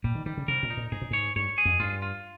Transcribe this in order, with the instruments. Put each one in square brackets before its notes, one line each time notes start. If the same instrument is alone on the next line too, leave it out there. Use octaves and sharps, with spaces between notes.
[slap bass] A#2 [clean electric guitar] G3
[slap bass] D#3
[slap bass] D#3 [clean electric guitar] G3
[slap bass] C#3
[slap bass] C3 [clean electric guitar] A#4
[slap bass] A#2
[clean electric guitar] D#4
[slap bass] A#2
[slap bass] G#2 [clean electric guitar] G#4
[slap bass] A#2
[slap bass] G#2 [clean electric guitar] C#5
[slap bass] G2 [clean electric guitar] C#5
[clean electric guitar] G#4
[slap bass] F2
[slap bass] G2 [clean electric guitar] F4
[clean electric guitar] F4